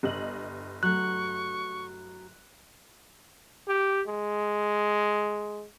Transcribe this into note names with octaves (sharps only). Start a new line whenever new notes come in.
G1 D#5 F#7
F#3 A3 C#6 F#6
G4
G#3